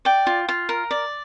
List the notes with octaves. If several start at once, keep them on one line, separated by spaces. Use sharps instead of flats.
D5 G5
F4
F4
A#4
D5